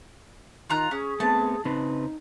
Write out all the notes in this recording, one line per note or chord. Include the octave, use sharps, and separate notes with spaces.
D#3 F4 A#5 F#6
C#4 G#4
A3 B3 C4 A5
C#3 C4 D#4 B4